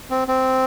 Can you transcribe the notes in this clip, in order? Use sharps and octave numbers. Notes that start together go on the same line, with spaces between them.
C4
C4